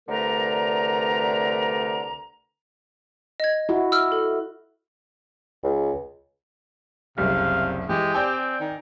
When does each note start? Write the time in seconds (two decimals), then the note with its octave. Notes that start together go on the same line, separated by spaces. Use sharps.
0.09 C2 D3 A3 A#4 B4 A#5
3.40 D#5 G#6
3.69 E4 F#4
3.92 E6 F6
4.12 A4
5.64 C#2
7.18 F#1 C2 C3 F5
7.89 E3 G#3 G4
8.14 C4 D5 G5 G#5
8.60 D#3